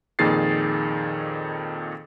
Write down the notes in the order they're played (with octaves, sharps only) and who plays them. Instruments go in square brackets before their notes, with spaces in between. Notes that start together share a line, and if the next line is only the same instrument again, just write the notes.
[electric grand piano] F2 A#2 D#3 G#4 A6 C7